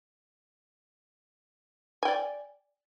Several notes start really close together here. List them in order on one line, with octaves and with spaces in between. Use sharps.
G#5 G5 D5